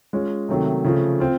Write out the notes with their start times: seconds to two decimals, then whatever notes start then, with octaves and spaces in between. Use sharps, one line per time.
0.13 G#3 C#4 F4
0.49 C3 D#3 F#3 A3
0.84 C#3 F3 A3
1.20 C4 F4